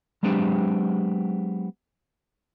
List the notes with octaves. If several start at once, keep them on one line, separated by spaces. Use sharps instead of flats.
F#3 G#3 B3 C4 D4 G4